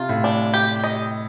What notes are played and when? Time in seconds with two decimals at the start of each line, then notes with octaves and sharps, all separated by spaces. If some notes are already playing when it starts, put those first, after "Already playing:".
Already playing: C3 F4
0.09 A2
0.24 D4
0.54 G4
0.84 D#5